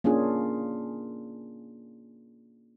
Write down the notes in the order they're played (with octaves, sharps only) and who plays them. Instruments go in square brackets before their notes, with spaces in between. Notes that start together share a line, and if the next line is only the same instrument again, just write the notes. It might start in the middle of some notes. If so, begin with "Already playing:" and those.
[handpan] A#3 C#4 D4 F4 G#4